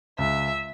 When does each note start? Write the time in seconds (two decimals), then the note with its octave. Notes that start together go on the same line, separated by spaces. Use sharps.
0.18 C#2 E5